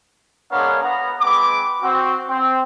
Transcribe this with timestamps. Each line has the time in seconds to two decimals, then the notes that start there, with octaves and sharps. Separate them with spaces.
0.52 G#3 B3 D4 A#4 C#5 F5
0.82 B3 A#5
1.21 G#3 C4 B4 D6
1.82 C4 F#4
2.29 C4